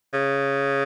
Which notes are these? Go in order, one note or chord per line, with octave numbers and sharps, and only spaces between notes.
C#3